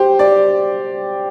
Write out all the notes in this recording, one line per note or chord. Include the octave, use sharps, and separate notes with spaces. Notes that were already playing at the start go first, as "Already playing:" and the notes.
Already playing: G4 C5
D5